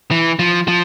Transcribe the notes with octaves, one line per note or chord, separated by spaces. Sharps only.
E3
F3
F3